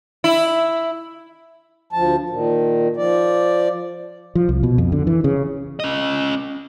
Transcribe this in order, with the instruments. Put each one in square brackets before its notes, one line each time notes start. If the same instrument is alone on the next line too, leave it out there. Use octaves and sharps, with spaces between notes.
[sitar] E4
[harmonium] D2 F3 A5
A#2 D#3
F3 D5
[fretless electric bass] F3
C2
B2
F2
D3
E3
C#3
[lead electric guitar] C#4 D#5